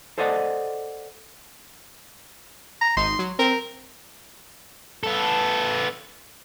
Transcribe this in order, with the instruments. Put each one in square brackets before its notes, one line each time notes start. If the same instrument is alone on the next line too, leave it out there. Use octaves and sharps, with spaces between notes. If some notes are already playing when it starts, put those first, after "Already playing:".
[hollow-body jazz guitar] A4 C5 D5 D#5 F#5
[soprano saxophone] A#5
[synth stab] G#1 D#4 [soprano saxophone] C6
[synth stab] F#3
[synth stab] C4 [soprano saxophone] A#4
[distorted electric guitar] B3 A4